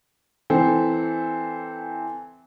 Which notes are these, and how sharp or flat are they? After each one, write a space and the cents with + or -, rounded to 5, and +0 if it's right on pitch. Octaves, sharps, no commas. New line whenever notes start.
E3 +0 C4 -10 A4 +0